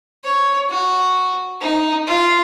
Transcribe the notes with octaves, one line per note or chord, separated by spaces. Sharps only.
C#5
F#4
D#4
F4